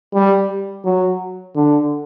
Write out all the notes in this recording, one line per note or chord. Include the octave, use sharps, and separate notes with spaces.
G3
F#3
D3